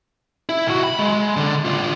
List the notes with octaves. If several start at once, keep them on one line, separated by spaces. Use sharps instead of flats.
E4
B1 F#4
B5
G#3
D3 D4
D4 F4